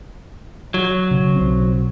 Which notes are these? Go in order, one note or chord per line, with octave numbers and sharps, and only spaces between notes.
F#3
C#3
B1 C4